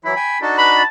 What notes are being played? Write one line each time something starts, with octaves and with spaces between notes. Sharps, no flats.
E3 F#3 E4 B5
G5 G#5
D4 D#4 F#4 A4
B4 B5
A5